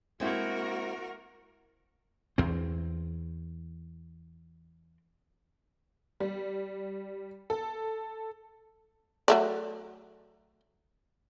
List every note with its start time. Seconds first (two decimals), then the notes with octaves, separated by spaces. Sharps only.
0.20 G#3 A#3 C4 E4 F#4 A#4
2.38 E2 C4
6.20 G3
7.50 A4
9.28 F#3 A3 D5